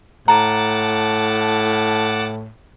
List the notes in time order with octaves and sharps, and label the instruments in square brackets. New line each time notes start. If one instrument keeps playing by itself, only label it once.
[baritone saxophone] A2 [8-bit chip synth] F#5 A5 D6 [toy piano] A#5